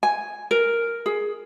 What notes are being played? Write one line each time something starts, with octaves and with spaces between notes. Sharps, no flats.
G#5
A#4
G#4